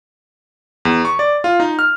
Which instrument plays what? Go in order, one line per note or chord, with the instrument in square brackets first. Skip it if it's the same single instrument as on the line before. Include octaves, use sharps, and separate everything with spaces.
[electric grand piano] E2
C#6
D5
F4
D#4
F6